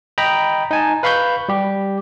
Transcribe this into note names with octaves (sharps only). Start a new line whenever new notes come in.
D#5 G5 A#5 B5
D#4 G#5 A5
B4 F5 B5 C#6 G6
G3 G4